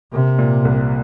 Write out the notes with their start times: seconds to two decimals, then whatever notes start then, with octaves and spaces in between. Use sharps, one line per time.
0.13 C3 A#3
0.39 A#2
0.65 C2